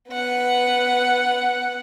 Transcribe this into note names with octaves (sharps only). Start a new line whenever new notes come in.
B3 F#5